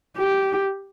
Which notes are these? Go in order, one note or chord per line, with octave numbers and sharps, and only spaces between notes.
G4